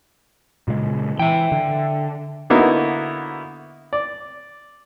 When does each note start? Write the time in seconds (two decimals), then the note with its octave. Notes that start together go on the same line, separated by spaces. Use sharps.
0.68 A#2 C#3 G#3
1.19 E3 E5 G5
1.52 D3
2.50 D3 A#3 B3 D#4 E4 F#4
3.93 D5